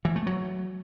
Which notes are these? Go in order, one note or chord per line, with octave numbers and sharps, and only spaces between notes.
E3
A3
F#3